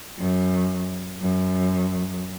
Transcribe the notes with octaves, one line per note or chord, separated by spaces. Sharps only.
F#2
F#2